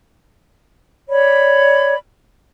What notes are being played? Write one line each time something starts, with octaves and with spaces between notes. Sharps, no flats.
C#5 D5 B5